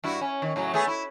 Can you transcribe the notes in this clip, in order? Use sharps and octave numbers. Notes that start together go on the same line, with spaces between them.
G2 E4 F#4
C#4
D#3
A2 C#3 F#3
A3 B3 G#4
E4